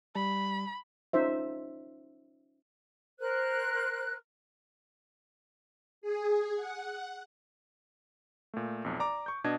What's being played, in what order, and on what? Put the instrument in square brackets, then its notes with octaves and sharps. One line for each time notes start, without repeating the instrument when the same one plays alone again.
[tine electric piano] G3 [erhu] B5
[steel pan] C#4 D#4 F4 C5 E5
[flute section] A#4 C5 F#6
[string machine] G#4
F#5
[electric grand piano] A#2 A3
B1 F2
D5 A#5 D6
C#6 G6
B2 D4 D#5 G#6